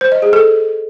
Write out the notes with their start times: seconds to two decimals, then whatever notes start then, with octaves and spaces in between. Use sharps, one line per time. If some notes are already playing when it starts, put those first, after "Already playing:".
0.01 C5
0.12 D#5
0.22 G#4
0.33 A4